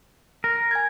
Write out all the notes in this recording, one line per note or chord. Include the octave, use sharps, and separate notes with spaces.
A#4
G#5 G#6